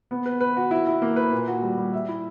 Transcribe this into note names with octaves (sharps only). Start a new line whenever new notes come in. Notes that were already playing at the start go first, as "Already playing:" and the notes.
B3
B4
B4
F#4
E4
E4
A#3
B4
A#2
F#4
G3
G3
E5
E4